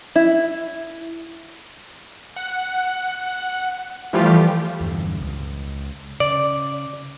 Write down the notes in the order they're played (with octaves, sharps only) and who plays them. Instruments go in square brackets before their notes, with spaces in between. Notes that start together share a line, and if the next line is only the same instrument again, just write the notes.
[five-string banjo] E4
[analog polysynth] F#5
E3 F3 G3 A3 F4 G4
[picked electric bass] E2 G2 D3
C#2
[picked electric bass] C#3 [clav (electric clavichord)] D5